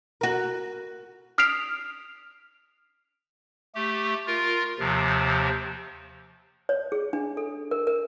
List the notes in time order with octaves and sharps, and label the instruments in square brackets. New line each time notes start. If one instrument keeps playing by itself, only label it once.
[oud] F#4 A#4
[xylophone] D#6 F6 B6 C7 D7 F7
[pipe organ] A3 G4
F4 A#4
D#2 C3 F3
[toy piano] C#5
G#4
D4
A4
A#4
A#4